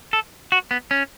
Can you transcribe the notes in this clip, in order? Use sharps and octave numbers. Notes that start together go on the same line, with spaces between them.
A4
F#4
B3
C#4